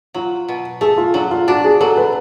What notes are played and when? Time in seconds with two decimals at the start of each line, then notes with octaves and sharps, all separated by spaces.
0.14 F#3 F4
0.48 B2
0.81 A3 G#4
0.98 F4
1.14 F#3 D4
1.31 F4
1.48 D4 F#4
1.65 G#4
1.81 F#3 A4
1.97 B4